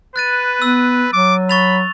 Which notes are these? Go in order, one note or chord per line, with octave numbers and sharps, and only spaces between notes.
B4 F#6 A6 D#7
B3 E6
F#3 D6
B5 C#6 A6 F7